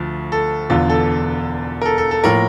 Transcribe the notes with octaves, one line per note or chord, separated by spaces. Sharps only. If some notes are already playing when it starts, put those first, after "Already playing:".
Already playing: D2 F3 A3
A4
E1 E2 D3 F4
A4
A#4
A4
A4
A4
A2 F3 A#3 A#4